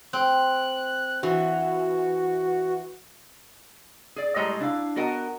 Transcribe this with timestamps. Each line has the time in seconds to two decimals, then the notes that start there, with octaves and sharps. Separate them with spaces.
0.13 C4 F#6
1.23 E3 F#4
4.16 G#4 D5
4.36 A2 G3 G#3 C#5 D#5 A#5
4.60 D4 E4 F5
4.96 B3 F#4 A#4 D#5 F#5 A5